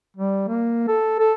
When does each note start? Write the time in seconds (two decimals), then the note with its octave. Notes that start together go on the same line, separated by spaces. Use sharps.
0.17 G3
0.48 A#3
0.88 A4
1.20 A4